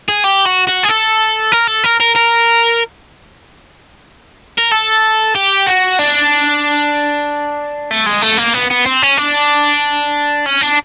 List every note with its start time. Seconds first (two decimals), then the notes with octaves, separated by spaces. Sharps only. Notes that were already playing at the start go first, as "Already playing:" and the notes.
0.09 G#4
0.24 G4
0.45 F#4
0.67 F#4
0.83 G#4
0.89 A4
1.52 A#4
1.67 A4
1.84 A#4
2.00 A#4
2.16 A#4
4.58 A#4
4.71 A4
5.35 G4
5.67 F#4
5.99 D4
7.91 A3
8.06 G#3
8.22 A3
8.37 A#3
8.54 B3
8.70 B3
8.86 C4
9.02 C#4
9.17 D4
10.46 C#4
10.61 D4